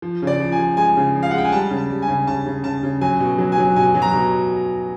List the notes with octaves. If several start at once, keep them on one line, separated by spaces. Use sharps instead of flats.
F3
C#3
D5
F3
G#5
F3
G#3 G#5
C#3
F3
F5
F#5
G#3 G5
G#5
G3 A5
C#3
A5
G3
G#5
C#3
C#3 A5
C#3
C#3 A5
C#3
F#3 G#5
B2
F#3
G#5
F#3
B2 G#5
F#3
A#5
B2